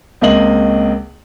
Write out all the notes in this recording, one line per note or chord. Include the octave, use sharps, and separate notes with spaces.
C#2 A#3 C4 D#5 F#7